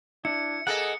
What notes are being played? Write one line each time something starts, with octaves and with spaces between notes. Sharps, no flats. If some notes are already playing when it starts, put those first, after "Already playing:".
D4 E4 C#7
A#3 G#4 A4 D#5 F#5